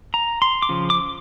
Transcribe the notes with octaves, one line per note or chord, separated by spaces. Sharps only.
A#5
C6
D6
C#3 F3
D6